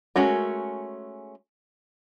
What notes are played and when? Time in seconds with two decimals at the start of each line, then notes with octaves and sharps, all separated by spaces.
0.16 G#3 A3 C#4 F#4 A#4